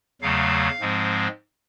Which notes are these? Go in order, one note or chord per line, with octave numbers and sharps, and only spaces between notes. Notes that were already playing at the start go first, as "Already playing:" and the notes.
E2 C#3 F#3 A3 F5
G#2 F3 G#3 C4